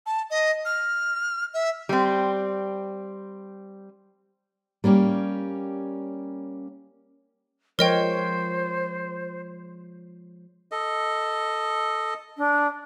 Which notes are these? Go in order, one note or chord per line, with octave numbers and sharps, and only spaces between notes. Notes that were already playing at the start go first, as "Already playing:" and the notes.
A5
D#5
F6
E5
G3 C4
G3 A#3 C#4 G4
F3 G#3 A#4 C5 C#5 D#5 G5
A4 D#5
D4